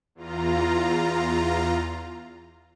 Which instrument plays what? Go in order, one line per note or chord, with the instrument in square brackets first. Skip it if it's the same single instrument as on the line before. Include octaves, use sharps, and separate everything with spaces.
[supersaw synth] E2 F4 A#5